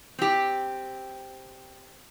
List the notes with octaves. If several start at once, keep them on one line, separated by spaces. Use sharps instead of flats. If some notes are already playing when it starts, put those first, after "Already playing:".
C4 G4